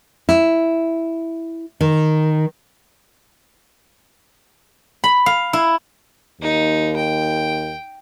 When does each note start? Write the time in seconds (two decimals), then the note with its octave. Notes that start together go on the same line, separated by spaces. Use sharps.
0.29 E4
1.81 D#3
5.04 B5
5.26 F5
5.53 E4
6.42 D#2 D#4
6.96 G5